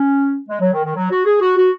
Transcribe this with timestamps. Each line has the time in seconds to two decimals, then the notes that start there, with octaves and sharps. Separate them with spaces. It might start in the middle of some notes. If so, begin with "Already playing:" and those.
Already playing: C#4
0.49 G#3
0.61 F#3
0.73 D#3
0.84 D#3
0.96 F#3
1.11 F#4
1.26 G#4
1.41 F#4
1.56 F#4